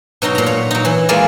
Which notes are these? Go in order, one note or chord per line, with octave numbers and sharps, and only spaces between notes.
B2 F#3 D#4 C6
A#2 A#5
C#5
F#3 D#4
E3
E3 G#3 A#3 F4 D5 E5